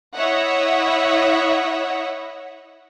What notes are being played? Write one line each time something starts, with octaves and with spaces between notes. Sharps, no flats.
E4 C#5 D#5 E5 F#5